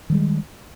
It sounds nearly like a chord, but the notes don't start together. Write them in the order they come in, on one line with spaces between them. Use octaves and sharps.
D#3 G3 G#3